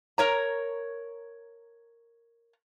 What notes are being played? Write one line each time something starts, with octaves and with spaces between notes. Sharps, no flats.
A#4 C#5 A#5